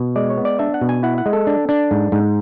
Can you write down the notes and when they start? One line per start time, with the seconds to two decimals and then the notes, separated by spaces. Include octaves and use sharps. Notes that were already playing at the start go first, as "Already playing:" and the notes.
Already playing: B2
0.16 G#3 D5
0.30 C#5
0.37 B3
0.45 D5
0.59 D4 E5
0.74 F#5
0.81 B2
0.89 G#5
1.03 E4 F#5
1.18 F#5
1.26 G#3
1.33 A4
1.47 D4
1.69 D4
1.91 G#2
2.12 G#2